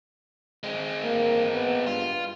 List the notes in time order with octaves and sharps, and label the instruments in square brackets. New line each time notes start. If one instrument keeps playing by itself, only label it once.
[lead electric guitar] G#3 C4
[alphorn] A#3
B3
[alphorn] G2 [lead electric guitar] F4